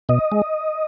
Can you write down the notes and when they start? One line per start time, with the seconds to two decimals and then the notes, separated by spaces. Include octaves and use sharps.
0.09 B2 D#5
0.32 G#3